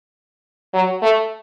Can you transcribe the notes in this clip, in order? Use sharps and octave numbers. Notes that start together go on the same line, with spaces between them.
F#3
A3